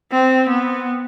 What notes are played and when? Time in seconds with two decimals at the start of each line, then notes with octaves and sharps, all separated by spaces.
0.11 C4
0.49 B3